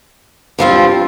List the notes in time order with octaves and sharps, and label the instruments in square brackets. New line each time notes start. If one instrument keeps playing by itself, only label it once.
[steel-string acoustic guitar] G2 F3 C4 F4